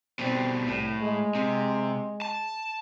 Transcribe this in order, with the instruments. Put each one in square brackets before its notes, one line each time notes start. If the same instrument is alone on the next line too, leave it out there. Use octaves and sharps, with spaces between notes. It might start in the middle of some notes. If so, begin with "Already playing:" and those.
[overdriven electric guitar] B2 G3 [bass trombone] C4
[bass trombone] C2 [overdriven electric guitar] A2
[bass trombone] G#3
[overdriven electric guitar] C3
A5